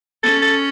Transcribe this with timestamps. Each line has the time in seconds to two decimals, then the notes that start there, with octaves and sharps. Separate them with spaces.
0.23 C#4 A4
0.42 A4